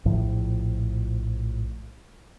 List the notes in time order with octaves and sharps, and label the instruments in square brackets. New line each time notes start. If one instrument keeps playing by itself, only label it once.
[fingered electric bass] A#1 A2 F3